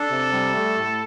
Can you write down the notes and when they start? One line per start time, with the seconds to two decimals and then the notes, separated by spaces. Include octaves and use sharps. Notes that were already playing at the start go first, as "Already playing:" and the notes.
Already playing: D4 A4
0.11 C3
0.32 G3
0.55 A3
0.76 A2